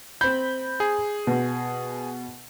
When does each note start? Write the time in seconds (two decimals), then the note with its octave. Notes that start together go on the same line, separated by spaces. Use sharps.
0.21 C4 B5 G6
0.80 G#4
1.27 B2